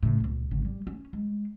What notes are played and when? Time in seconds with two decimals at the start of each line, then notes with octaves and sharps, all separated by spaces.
0.03 A2 C#3
0.20 D#1 C#2
0.51 G#1 C#3
0.65 G3
0.87 C#4
1.13 G#3